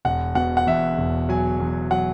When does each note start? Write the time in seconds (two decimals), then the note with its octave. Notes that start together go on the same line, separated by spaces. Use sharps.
0.05 E1 F#5
0.35 B2 F#5
0.57 F#5
0.67 E2 E5
0.98 E1
1.29 F#3 G#5
1.60 E2
1.91 F#3 F#5